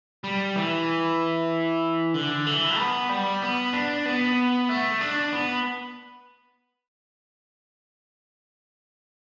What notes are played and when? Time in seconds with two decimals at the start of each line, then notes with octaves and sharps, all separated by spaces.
0.24 G3
0.56 E3
2.14 D3
2.47 E3
2.78 B3
3.09 G3
3.42 B3
3.73 D4
4.05 B3
4.69 A3
5.01 D4
5.32 B3